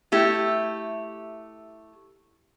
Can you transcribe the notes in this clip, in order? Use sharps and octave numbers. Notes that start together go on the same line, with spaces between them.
A3 E4 G4